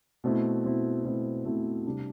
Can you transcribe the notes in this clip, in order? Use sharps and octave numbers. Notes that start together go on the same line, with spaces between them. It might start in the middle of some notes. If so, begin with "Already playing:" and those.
B2 A3 C4 E4
B2 A3 C4 E4
B2 A3 C4 E4
B2 A3 C4 E4
C3 G3 D4